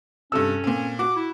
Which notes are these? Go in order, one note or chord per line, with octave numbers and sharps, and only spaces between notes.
G2 C3 C#4 A4 E6
A#2 C4
F#4 D6
E4